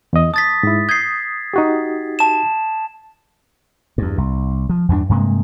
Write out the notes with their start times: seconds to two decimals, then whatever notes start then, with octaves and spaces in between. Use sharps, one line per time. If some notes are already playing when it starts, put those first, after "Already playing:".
0.13 E2 D#5
0.34 A5 D#6 A6 B6
0.63 G#2 E4
0.89 D#6 G6 G#6 C7
1.54 D#4 F#4 G4
2.19 A5 E7
3.98 E2 G2
4.18 C2
4.69 F3
4.89 E2 G2 A#3 D4
5.09 G2 C3 G#3 A#3